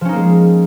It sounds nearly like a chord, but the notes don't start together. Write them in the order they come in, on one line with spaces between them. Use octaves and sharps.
F3 C#4 D#4 A#3 G#3